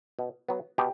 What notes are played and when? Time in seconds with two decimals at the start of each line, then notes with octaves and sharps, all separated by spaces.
0.19 B2
0.49 F#3 B3
0.78 B2 G4